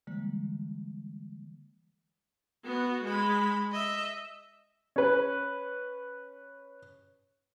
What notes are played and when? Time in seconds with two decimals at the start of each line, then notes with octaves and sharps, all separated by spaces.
0.07 D3 E3 G3 G#3 A#3
2.65 B3 F#4
3.04 G#3 B5
3.72 D#5 E5
4.96 C#4 B4